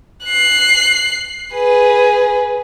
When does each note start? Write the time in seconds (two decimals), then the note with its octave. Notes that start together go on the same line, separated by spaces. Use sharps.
0.25 F#6 C7
1.54 G#4 B4